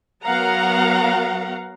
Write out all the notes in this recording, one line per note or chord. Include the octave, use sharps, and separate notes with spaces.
F#3 B3 A#4 F5 F#5 A#5